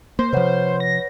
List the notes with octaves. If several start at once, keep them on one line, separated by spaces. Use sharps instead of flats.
A#3 C5
C3 F3 B4 C#5 F#5
A#6